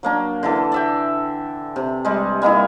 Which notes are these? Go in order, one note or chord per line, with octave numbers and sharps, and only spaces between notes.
F#3 A#3 D4
D3 E3 A4
D5 E5 G5
C3
G3 G#3
G3 A#3 D#4 E4